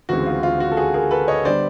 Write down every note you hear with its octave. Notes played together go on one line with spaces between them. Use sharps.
D2 C#3 E3 G#3 C4 F#4
F4
F4
F#4
A4
F#4 G#4
G#4 A#4
A4 B4
C#5 D#5
D3 G3 B3 C5 D5